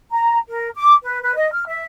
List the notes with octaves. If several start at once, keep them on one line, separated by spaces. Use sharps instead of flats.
A#5
A#4
D6
B4
B4
D#5
F6
E5